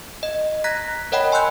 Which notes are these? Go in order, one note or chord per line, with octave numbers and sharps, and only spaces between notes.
D#5
A#5 F#6 G#6 A#6 B6
A#4 C#5 D#5 F#5 G5 B5
G#5 C6 E6 F#6 G6